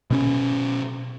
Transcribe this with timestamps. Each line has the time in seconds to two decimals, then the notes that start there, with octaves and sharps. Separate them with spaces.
0.10 B2 C4 C#4